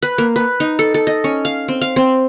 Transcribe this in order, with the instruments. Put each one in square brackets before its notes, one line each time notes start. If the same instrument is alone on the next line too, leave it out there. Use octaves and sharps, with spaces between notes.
[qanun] B4
A#3
B4
D#4
A4
A4
D#5
C#4
F5
C4
F5
C4